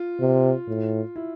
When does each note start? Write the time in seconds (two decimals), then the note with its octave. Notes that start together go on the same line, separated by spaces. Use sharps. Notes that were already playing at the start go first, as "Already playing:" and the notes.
Already playing: F4
0.20 C3
0.68 A2
1.16 E4